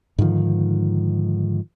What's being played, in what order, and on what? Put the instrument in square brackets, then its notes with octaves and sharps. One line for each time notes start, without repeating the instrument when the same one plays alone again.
[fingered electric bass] G#2 D3 D#3 F3